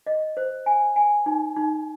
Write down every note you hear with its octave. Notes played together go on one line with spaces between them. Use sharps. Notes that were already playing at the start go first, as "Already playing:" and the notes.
D#5
C5
G#5
G#5
D#4
D#4